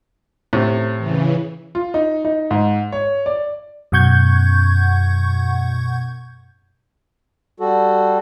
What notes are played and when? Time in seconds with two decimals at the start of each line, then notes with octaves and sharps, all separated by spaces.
0.53 A2 C3
0.98 C#3 E3
1.75 F4
1.94 D#4
2.25 D#4
2.51 G#2
2.92 C#5
3.26 D5
3.92 F#2 B2 F#5 C#6 G6 G#6
7.60 G3 F#4 A4